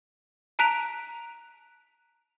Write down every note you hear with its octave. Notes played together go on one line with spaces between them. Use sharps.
A5 A#5 F#6 B6 D7 F7